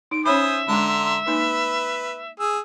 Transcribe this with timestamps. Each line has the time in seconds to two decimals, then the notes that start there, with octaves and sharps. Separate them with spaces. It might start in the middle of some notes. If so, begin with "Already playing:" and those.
0.11 D#4 D7
0.26 C#4 C5 C#5 E5 G#5 B5 D#6
0.68 D3 G#3 D4 A#5 C6
1.27 A#3 D#4 B4
2.40 G#4 E6